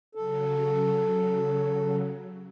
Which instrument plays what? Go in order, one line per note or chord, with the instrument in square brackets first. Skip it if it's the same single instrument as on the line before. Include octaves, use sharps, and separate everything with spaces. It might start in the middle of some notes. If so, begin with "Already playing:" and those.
[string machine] C#3 F#3 [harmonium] A4